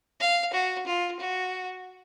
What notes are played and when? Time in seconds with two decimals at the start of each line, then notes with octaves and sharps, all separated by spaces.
0.20 F5
0.54 F#4
0.86 F4
1.19 F#4